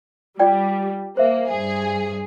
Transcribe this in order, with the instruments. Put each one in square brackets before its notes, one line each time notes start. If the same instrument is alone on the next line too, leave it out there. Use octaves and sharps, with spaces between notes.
[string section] G3 [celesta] F4 D5 G5
[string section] A#3 [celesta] C5 E5
[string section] G2 G#4